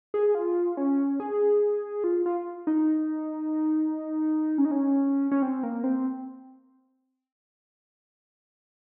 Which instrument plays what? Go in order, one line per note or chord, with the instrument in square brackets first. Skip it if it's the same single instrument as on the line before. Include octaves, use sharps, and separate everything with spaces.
[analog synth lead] G#4
F4
C#4
G#4
F4
F4
D#4
C#4
D#4
C#4
C#4
C4
A#3
C4